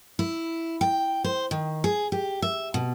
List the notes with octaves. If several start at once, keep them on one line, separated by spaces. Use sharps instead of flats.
E4
G5
C5
D#3
G#4
G4
E5
B2